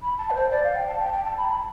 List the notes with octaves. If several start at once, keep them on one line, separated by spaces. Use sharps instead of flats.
B5
A5
B4
C5
D5
F5
G5
A5
G5
G5
A5
B5
A5
B5